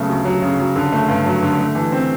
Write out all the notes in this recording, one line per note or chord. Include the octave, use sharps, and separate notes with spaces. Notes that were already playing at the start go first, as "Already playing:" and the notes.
Already playing: C#3 F#3 A3 B3
D2
F#3
C#3
F#3
D3
A3
G2
F#3
D3
A3
E3
C4